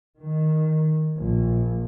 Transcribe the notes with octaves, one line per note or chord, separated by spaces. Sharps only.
D#3
A#1